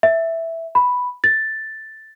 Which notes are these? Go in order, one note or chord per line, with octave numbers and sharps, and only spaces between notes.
E5
B5
A6